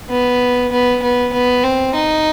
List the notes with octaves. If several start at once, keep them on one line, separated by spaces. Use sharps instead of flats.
B3
B3
B3
B3
C4
D#4